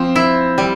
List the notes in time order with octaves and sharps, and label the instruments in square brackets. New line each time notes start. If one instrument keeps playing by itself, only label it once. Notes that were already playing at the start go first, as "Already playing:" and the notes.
Already playing: [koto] F3 [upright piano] C4
[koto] E4
G3